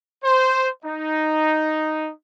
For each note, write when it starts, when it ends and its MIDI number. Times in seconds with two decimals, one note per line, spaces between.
0.25 0.69 72
0.85 2.11 63